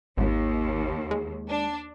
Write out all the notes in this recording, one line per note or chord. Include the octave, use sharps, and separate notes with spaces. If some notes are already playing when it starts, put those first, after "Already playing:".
G#1 D#2
G#3
D4